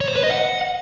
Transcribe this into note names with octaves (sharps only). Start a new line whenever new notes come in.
C#5
C5
B4
D#5
F#5